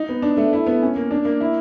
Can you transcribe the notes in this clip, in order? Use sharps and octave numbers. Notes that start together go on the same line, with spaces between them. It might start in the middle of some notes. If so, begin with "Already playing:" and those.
Already playing: D#4
B3
D4
A3
E4
B3
C#4
A#3
D4
A#3
E4